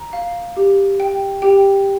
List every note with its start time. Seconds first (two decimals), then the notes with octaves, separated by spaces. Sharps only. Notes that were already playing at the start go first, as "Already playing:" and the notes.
Already playing: A#5
0.13 F5
0.57 G4
1.00 G5
1.42 G4 G5